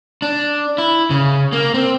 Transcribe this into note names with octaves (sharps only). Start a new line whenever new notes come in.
D4
E4
C#3
A#3
C4